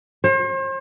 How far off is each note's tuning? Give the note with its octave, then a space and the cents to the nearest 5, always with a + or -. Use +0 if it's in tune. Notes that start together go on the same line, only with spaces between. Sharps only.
C5 +40